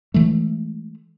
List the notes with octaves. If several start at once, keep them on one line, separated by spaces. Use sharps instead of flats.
E3 G#3 A3